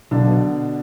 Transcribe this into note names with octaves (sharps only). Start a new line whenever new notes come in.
B1 D3 D4
B2